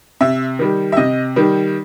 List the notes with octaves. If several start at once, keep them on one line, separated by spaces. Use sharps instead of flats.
C3 E5
D#3 G3
E5
C3 D#5
D#3 G3